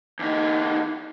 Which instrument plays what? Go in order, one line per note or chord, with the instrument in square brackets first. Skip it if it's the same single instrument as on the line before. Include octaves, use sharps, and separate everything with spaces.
[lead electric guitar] E2 D#4